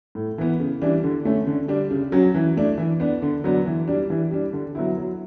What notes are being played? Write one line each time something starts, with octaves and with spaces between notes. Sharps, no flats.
A2
E3 B3
C#3
E3 G3 D4
D3
A3 C#4
D3
G3 D4
C#3
F#3 C#4
E3
A3 D4
E3
B3 D4
D3
F#3 B3 D4
E3
G3 D4
E3
G3 D4
D3
F#3 B3 E4
F#3